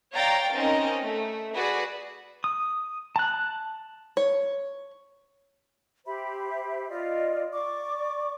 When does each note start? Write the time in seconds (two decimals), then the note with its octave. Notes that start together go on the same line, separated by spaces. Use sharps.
0.15 C#5 D5 F5 G5 A#5 A6
0.54 C4 C#4 D#4 A#4 D#5
1.02 A3
1.55 F#4 G#4 B4 D5
2.44 D#6
3.16 A5 F#6
4.17 C#5
6.05 G4 C5 E5 B5
6.90 F4 D5 D#5
7.53 D5 C#6 D6